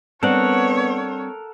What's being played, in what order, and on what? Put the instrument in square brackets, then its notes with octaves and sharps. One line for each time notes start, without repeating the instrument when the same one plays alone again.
[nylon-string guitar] G3 C4 D4 [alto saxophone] B3 [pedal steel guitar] A4 A#4 F#5 [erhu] C#5